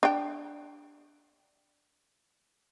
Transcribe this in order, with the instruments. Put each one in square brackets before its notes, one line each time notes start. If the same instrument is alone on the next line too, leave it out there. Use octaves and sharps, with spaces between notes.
[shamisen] D4 G5